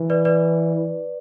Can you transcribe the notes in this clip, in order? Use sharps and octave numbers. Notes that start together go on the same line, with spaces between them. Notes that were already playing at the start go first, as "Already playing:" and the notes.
Already playing: E3
B4 D5
B4 D5